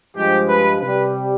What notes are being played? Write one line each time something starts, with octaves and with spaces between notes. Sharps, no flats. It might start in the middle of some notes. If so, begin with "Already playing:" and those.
G2 F3 G#3 G4
B4
C3 G3 B4